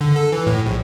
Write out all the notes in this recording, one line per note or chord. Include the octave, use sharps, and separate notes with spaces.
D3
A4
E3
A2
A#1